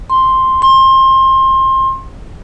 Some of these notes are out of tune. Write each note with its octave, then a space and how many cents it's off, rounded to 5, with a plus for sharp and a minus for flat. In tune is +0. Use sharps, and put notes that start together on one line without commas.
C6 +5
C6 +25